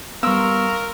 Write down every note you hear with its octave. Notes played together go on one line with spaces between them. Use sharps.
G3 B3 A#4 F5 C6 C#6 E6